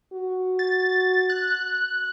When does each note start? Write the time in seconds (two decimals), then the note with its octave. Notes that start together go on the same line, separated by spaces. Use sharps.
0.13 F#4
0.59 A6
1.30 F#6